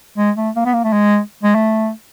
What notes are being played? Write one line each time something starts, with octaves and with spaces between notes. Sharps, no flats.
G#3
A3
A#3
B3
A#3
A3
G#3
G#3
A3